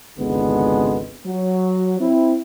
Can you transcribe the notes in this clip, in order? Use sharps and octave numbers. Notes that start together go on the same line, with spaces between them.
G#1 C#2 D3 G#3 B3
F#3
C4 E4